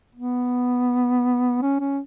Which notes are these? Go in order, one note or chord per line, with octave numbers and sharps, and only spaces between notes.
B3
C#4
C#4